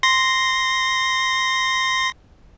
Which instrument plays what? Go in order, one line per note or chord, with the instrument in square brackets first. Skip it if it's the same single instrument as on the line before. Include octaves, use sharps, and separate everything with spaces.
[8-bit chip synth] C6 A#6